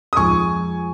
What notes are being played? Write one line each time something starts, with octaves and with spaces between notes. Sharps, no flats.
D#6
F2 F3 G#3 D#4 G#5 C#6